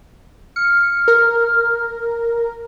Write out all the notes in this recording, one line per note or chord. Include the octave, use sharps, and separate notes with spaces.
F6 C#7
A#4